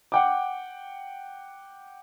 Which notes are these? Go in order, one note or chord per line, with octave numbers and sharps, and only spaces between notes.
F#5 G5 D6